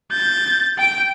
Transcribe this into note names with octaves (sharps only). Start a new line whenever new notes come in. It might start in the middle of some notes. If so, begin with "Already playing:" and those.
G6 A6
G5 D7